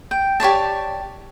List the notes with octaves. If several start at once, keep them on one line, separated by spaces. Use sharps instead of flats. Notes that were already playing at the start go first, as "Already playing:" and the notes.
G5
G4 C#5 D5 A5